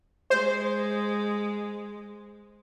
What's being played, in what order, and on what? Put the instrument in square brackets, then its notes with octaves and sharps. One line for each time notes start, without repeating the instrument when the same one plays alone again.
[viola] G#3 [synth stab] C5